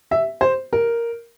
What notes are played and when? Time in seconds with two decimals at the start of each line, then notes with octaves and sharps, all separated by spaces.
0.11 E5
0.41 C5
0.73 A#4